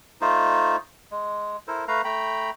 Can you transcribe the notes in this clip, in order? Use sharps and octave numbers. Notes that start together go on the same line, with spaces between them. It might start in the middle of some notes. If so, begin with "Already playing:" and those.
A3 D#4 F4 C5
G#3
E4 A4 A#4 C5
A3 B4 F5 A#5
A3 G5 A#5 B5